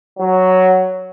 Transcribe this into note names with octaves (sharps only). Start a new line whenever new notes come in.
F#3